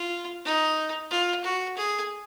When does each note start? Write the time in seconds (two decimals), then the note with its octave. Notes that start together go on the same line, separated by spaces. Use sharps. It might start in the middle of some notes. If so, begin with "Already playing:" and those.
Already playing: F4
0.44 D#4
1.11 F4
1.44 F#4
1.77 G#4